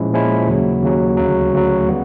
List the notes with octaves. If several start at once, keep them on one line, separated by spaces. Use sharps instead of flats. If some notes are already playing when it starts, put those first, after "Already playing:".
Already playing: A#2 F3 G#3 C#4 E4
A#2 F3 G#3 C#4 E4
D#2 C#3 F#3
D#2 C#3 F#3
D2 C#3 F#3
D2 C#3 F#3
G3 B3